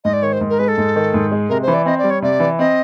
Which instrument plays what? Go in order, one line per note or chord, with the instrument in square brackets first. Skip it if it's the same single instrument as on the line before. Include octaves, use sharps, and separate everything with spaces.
[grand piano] G#2 [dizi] D#5
[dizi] D5
[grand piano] D#3 [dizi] C#5
[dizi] C5
[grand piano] G#2
[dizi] A#4
[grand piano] G#3 [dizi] B4
[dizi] A4
[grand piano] G#2
D#3
G#2
G#3
[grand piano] C3 [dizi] A#4
[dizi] C5
[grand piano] E3
[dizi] D5
[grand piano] C4 [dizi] D#5
[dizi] D5
[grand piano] G3
[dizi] C#5
[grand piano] C3 [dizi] D5
[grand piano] E3
[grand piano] C4 [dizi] D#5